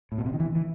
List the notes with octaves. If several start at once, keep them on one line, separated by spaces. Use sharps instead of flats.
A2
B2
C3
D#3
E3
E3